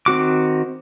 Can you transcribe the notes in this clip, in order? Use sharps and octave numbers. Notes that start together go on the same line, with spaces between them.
D#3 C4 F#4 D6